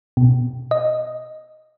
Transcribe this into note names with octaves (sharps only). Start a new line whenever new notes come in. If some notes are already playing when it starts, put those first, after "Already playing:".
B2
D#5